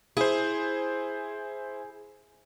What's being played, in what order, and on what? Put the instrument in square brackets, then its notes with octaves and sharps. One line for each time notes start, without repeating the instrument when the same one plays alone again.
[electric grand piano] E4 C5 [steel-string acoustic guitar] G#4